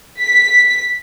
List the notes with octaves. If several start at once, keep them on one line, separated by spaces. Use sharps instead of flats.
B6